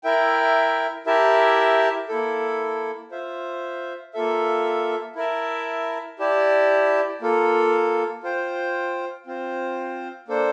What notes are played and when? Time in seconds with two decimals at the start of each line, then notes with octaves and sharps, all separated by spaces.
0.04 E4 A#4 E5 G5
1.06 E4 G4 A#4 E5 A5
2.09 A#3 E4 A4
3.11 F4 C5 E5
4.14 A#3 F4 A4 E5
5.16 E4 A#4 E5 A5
6.19 E4 G4 D5 A5
7.22 A#3 F4 A4
8.23 F4 C5 G5
9.26 C4 F4 C5
10.28 A#3 D4 A4 C5